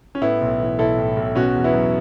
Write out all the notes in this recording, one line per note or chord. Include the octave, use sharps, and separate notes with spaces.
C#4
A2 B3 E4
B1
E3
B1 E4 A4
A2
B1
B2 C#4 F#4
E2
B3 E4
F#3